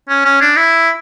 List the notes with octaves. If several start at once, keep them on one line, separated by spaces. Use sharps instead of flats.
C#4
C#4
D4
E4